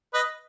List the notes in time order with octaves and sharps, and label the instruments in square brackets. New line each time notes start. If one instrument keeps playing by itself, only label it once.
[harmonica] B4 D#5